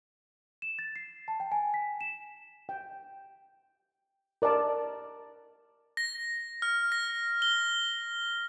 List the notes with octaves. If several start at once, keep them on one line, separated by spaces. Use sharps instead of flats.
E7
A6
C7
A5
G5
G#5
B6
E7
G5
A#4 D5 D#5 A5
A#6
F6
A#6
G7